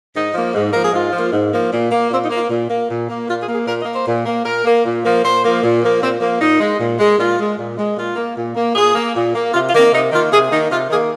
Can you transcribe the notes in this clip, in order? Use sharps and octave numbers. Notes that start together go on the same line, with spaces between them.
G#2 D#4
F3 A#3
G#2
F3 A#3 A#4
G#4
G#2 F4
F3 A#3
G#2
F3 A#3
A#2
A#3
A#2 C4
D#4
A#3
F4
A#2
A#3
A#2
A#3
A#2 F4
G#4
A#3
G#4
A#2 A#4
D#5
A#3
C5
A#2
A#3
A#2 A#4
A#3
A#2
F3 A#3
A#2 C5
F3 A#3
A#2
F3 A#3
A#2 C4
F3 A#3
A#2 D#4
G#3
A#2
G#3
A#2 F4
G#3
A#2
G#3
A#2 F4
A#3
A#2
A#3
A#2 G#4
A#3
A#2
A#3
C3 F4
F4
D#3 A#3
C4
C3 D#4
D#3 A#3 F4
C3 G#4
D#3 A#3 D#4
C3 F4
D#3 A#3 G#4